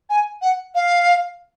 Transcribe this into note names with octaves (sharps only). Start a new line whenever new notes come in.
G#5
F#5
F5